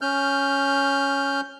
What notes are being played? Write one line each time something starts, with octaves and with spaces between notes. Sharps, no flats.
C#4 F6 G6